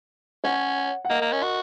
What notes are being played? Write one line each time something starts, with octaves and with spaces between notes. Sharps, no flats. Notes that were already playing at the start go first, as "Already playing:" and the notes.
C#4 C#5 F#5
F#5
A#3 A#4 D#5
A#3
C#4
F#4